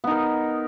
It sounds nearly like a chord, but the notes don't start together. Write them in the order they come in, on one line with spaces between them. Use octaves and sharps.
B3 D#4 A#4